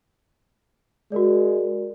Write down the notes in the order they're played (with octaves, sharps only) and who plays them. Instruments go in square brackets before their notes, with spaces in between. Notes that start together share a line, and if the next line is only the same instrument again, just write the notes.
[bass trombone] G#3 [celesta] F#4 A#4 D5